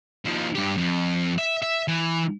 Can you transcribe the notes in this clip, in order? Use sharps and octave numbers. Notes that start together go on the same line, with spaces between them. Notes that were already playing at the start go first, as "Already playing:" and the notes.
D#2 F3
G2 G4
F2
E5
E5
E3